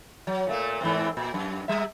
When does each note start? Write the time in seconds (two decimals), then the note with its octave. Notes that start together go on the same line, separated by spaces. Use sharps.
0.27 F#3
0.47 A#2 A3 A#3
0.81 G#2 E3 C4
1.17 A#2
1.34 F#2
1.68 G3 E5